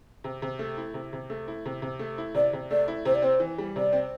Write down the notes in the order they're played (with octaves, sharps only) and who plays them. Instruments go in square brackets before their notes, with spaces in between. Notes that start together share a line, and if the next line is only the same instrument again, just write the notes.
[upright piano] C3
C3
A3
E4
C3
C3
A3
E4
C3
C3
A3
E4
[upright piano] C3 [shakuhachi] D5
[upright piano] C3
[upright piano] A3 [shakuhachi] D5
[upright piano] E4
[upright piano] C3 [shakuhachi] C5
[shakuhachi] D5
[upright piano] C4 [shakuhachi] C5
[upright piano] E3
G3
[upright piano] C3 [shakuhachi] D5
[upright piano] C4